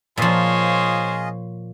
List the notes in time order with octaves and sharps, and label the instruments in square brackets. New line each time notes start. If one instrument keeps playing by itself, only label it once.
[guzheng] A#2 F3 [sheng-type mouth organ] F4 G#4 D#5 [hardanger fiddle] C5 C#5